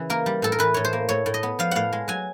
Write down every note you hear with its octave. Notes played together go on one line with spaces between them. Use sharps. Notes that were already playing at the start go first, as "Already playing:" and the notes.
Already playing: C#3 E3
A#3 A#4
G3
A2 A4
A#4
E3 B4
A2 C#5
C5
A#3
A2 C#5
A2
D#5
B3
F3 F5
A2 F5 F#5
G#3
F#3 G#5